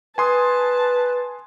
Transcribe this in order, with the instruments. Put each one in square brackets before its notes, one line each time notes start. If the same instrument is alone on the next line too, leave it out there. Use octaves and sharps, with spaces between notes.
[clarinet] B4 [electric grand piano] G#5 C6 D#6 [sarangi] A5